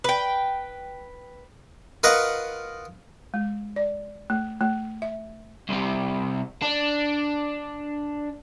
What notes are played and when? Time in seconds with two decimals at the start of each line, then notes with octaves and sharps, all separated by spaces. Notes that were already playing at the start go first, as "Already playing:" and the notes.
0.04 B4 G5
2.03 F4 A#4 B4 D#5 F#5 C#6
3.34 G#3
3.76 D5
4.30 A3
4.61 A3
5.02 E5
5.69 C2 C3
6.62 D4